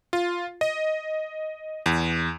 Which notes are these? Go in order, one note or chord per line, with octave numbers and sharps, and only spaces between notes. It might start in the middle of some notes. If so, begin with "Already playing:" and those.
F4
D#5
E2